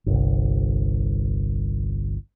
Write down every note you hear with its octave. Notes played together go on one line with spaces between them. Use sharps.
G1 C2